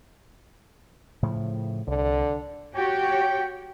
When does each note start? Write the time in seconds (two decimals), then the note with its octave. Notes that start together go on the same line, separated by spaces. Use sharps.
1.23 A2 C#3 F3
1.87 C2 D3
2.75 F#4 G4 C#5 G5